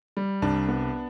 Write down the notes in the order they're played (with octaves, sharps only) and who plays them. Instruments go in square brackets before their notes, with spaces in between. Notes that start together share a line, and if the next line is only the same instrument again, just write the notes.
[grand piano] G3
[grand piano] C2 [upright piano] D4
[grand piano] B3